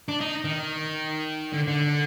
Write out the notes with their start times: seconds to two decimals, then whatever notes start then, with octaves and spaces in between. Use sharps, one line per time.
0.08 D4
0.21 D#4
0.44 D#3
1.53 D3
1.68 D3